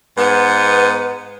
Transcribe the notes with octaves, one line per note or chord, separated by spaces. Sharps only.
G#2 B3